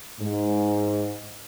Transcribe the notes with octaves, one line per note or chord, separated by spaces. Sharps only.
G#2